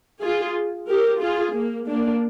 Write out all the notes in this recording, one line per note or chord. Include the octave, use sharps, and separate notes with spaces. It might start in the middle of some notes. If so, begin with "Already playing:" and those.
F4 G#4
G4 A#4
F4 G#4
A#3
A#3 D4